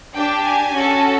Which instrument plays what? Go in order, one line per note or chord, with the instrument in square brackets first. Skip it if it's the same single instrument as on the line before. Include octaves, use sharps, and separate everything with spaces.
[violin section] D4 G4 G5
G#5
C#4 F#4 A4